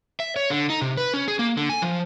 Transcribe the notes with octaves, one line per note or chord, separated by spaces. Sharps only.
E5
C#5
D3
D#4
C3
B4
C#4
G#4
A#3
D3
G#5
F3